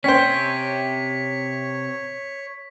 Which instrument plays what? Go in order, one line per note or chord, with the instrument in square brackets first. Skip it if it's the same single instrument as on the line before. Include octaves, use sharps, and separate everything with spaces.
[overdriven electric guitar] C3 G5 [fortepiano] C#4 C5 [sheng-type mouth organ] C#5 [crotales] B6